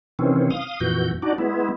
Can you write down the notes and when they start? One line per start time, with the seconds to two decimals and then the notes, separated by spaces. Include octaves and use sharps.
0.19 C3 D#3 E3 C4 C#4
0.50 F5 D#6
0.80 F2 A#2 E3 F#4 G6
1.22 D4 D#4 F#4 D5
1.38 G#3 B3 E4